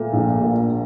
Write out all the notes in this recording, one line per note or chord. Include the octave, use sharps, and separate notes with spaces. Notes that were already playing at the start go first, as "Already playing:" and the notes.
Already playing: A#2 A3
A#1
A#2